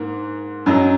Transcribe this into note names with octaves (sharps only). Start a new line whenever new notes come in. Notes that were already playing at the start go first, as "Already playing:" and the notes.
Already playing: G#2 A#3
F#2 F#3 D#4